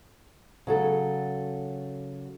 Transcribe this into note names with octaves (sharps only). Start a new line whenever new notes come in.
C#3 F#3 A4